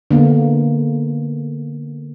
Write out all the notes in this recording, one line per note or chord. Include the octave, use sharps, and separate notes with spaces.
D3 A#3 B3